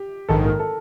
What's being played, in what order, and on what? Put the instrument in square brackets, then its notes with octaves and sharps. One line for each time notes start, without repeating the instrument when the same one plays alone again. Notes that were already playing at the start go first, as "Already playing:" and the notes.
Already playing: [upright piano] G4
[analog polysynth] A#1 G#2 D#3 [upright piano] A4
[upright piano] A#4
A4